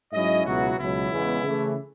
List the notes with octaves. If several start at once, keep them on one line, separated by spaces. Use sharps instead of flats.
G#2 F#3 C#4 E4 D#5
C#2 B2 F#3 B3 E4 F#4
C#2 B2 F#3 E4
E2 C#3 G#3 B3
C#3 E3 A3